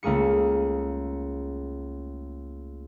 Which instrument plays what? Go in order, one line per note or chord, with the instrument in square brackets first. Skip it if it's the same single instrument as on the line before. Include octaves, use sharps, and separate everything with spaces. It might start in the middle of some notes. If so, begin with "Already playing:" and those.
[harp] C#2 A3 A#3 G#4 C#7